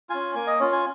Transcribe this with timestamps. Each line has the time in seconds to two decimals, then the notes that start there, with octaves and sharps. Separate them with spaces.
0.10 C#4 F4 G#5
0.35 A#3 G#5
0.47 D#5
0.60 C#4 F4 C#5
0.72 G#5